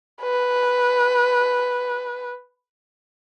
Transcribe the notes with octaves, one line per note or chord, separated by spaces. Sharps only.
B4